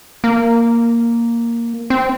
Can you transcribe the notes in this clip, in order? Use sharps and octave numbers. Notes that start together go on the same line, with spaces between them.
A#3
C4